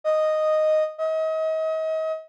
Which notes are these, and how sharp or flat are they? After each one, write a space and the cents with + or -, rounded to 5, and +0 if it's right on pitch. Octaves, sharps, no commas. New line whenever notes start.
D#5 -5
D#5 +35